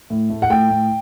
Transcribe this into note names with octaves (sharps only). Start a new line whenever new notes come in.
A2
A3
F#5
A2 G5
A2